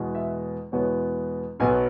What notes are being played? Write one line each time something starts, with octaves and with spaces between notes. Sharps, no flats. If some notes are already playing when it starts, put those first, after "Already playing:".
Already playing: E2 B2 G#3 B3
E5
E2 B2 G#3 B3 C#5
B1 B2 F#3 B3 G#5